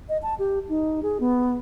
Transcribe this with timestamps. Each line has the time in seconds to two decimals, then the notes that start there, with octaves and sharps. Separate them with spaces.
0.09 D#5
0.23 A5
0.39 G4
0.69 D#4
1.03 G#4
1.20 B3